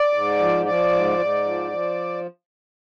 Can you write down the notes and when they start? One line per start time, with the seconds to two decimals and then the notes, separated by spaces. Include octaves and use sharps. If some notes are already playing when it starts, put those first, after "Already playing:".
Already playing: D5
0.13 G#2
0.39 F3
0.66 F3 D5
0.92 G#2
1.18 G#2
1.45 F3
1.71 F3